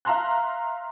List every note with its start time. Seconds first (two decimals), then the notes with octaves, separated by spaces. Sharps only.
0.05 E5 F5 A#5 C6 F#6